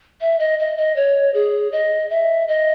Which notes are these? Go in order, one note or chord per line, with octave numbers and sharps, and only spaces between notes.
E5
D#5
D#5
D#5
C#5
G#4
D#5
E5
D#5